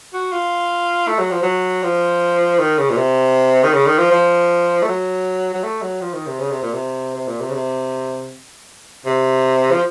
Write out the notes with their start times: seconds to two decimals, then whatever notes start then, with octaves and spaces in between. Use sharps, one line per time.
0.13 F#4
0.32 F4
1.08 A3
1.19 F#3
1.31 F3
1.43 F#3
1.83 F3
2.60 D#3
2.78 C#3
2.90 A#2
2.97 C3
3.64 D#3
3.74 C#3
3.87 D#3
3.99 F3
4.12 F3
4.83 A3
4.88 F#3
5.54 F#3
5.64 A3
5.82 F#3
6.01 F3
6.14 D#3
6.27 C3
6.39 C#3
6.51 C3
6.62 A#2
6.74 C3
7.15 C3
7.28 A#2
7.41 C3
7.50 C#3
7.54 C3
9.06 C3
9.71 F3